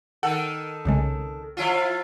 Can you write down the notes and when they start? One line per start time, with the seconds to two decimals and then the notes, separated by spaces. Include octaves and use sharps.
0.23 D#3 A4 F#5
0.85 C2 C#3 G#3
1.57 F3 E4 F4